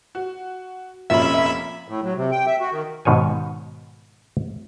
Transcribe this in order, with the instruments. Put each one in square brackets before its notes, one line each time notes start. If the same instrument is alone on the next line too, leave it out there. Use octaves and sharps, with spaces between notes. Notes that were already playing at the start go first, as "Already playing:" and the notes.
[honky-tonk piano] F#4
[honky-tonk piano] F1 A#2 C#4 [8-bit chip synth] E5 B5
[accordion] A2
F#3
C3
G5
E5
F#4
D#3
[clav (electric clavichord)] G#2 B2 D#3 C#5 G#5